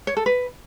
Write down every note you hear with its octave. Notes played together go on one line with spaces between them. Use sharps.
C#5
A4
B4